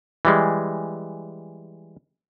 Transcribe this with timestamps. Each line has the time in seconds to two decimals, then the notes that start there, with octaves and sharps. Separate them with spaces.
0.25 E3 G3 G#3